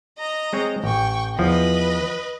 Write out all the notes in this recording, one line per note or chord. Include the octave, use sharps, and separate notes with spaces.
D#5 A#5
G#3 C4 C#5
A1 G5 C#6
E2 F3 B4 D#5